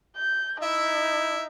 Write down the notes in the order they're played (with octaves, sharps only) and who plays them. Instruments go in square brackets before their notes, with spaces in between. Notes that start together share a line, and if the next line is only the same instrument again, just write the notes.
[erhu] G6
[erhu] D#4 [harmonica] E4 E5